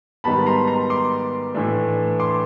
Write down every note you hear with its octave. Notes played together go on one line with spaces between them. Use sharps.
G#2 D#3 G3 B3 A5 B5
A#5 C6
A#5 C6
C6 D6
A2 E3 A3 D4
C6 D6